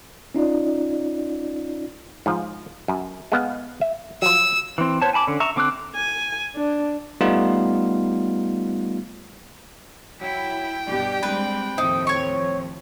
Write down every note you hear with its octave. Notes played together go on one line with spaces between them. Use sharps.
C#4 D#4 F4 D5
G#2 F3
F#2
G#3 B3 F5
E5
F3 F#3 E6
E3 C4
B3 C5 C#5 A5
G#5 A5 B5 D6
D3 C#4
E5 A#5 C#6
D3 C4 D6 E6 F#6
G#5
D4
G3 A3 B3 D#4 F4
F#3 E4 G5
G2 B2 D4 G4
G3 G#3 C4 B4
D#2 A2 F3 C4 D#4
C#5 C#6